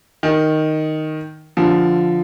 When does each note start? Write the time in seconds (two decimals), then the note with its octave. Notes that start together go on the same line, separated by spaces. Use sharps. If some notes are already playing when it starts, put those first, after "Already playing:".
0.23 D#3
1.57 D3 F3